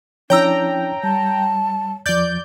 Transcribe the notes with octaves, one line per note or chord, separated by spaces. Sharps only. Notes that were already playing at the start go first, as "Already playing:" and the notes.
F3 C#4 D4 E4 C#5 G5 A#5 E6
G3 A5
E2 F3 D5 G6